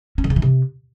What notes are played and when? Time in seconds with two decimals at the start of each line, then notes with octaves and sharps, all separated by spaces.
0.18 C#4
0.24 D#3
0.30 C#3
0.36 E3
0.42 C3